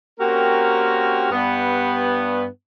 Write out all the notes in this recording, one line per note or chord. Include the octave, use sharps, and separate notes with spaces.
A#3 C4 C#4 F#4 G4 A#4
G2 B3